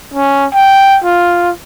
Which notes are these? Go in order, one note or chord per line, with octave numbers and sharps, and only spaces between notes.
C#4
G5
F4